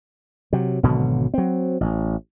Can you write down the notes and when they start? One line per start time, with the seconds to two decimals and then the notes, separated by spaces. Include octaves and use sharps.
0.53 C3 F#3
0.83 G#1 B2 D3 F#3
1.34 F#3 C4
1.81 A1